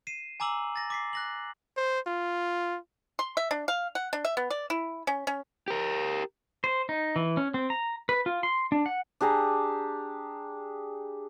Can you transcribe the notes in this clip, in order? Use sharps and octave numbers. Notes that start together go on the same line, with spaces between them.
C7 D#7 E7
G#5 A#5 D6 E6 F#7
A6 A#6
D6 B6 C7
F#6 A#6 F#7
C5
F4
C6
E5
D4
F5
F#5
D4
E5
B3
D5
E4
C#4
C#4
G4 A#4
C5
D#4
E3
C#4
C4
A#5
B4
F4
C6
D4
F#5
D4 G4 G#4 A#5